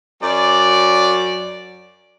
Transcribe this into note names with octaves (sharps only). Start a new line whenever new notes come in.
F#2 D5